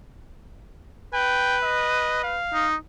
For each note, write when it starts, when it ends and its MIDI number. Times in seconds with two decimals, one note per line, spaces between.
1.14 2.39 71
1.14 1.58 79
1.63 2.21 75
2.23 2.67 77
2.53 2.75 63